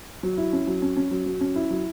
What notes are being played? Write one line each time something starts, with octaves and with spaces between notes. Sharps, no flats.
F#3
E4
C#4
F#3
C#4
C#4
F#3
F#3
C#4
E4
F#3